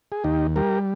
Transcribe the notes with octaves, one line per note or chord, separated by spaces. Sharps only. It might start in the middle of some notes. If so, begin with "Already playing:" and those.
G#4
D#2 D#4 G4
G3 G4 A#4